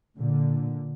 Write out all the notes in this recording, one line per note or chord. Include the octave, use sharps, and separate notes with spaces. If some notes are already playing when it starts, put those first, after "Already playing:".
A#2 D3